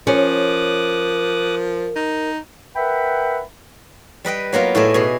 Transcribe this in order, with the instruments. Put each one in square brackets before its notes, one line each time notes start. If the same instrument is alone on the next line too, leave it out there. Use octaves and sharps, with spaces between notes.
[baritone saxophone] F3 [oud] C#4 [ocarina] A#4 [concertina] D6 D#6 F#6
[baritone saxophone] D#4
[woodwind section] A#4 B4 E5 F#5 G5 B5
[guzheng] G3 B4 D#5 G5
F#3 A#3 B3 F4
A2 E4 G#4 D5 D#5
B2 G#4